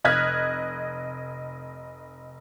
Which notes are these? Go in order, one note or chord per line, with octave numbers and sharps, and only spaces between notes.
F1 D#5 F6 F#6 G#6 B6